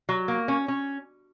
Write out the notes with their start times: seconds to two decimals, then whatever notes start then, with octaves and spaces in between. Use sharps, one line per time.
0.09 F#3
0.28 A#3
0.48 C#4
0.68 C#4